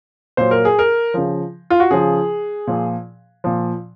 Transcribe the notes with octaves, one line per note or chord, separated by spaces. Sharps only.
A#2 F#3 C5
A#4
G#4
A#4
C#3 F3
F4
F#4
C#3 F3 G#4
A#2 F3
A#2 F3